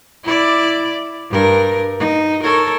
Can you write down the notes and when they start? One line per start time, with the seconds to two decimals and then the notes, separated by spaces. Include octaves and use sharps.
0.24 E4 D5
1.30 G2 A#4
1.99 D#4
2.43 A4 A#4 C#5